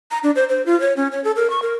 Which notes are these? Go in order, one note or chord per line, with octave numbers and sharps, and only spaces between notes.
A#5
D4
C5
C5
F4
C#5
C#4
C#5
A4
A#4
C#6
A#4